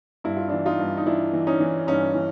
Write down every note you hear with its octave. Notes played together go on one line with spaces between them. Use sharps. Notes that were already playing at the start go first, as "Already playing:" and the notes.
G2 E4
F4
D4 E4
E3
D#4 F4
G2
D#4
E3 D4 E4
E3
C#4 D#4
E3
G2 C#4 D#4
E3